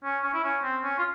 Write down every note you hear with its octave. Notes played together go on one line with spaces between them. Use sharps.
C#4
C#4
E4
C#4
C4
C#4
F4